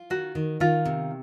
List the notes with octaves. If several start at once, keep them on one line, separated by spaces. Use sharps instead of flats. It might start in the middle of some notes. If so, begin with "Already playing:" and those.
Already playing: F4
D#3 F#4
D#3
D#3 F4
C3